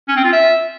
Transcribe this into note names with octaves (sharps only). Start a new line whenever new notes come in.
C#4
C4
F4
E5